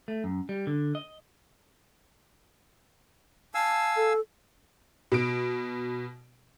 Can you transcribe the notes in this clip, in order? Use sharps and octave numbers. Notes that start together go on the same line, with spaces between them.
A3
F#2
G3
D3
D#5
F5 G#5 A5 E6
A4
B2 D7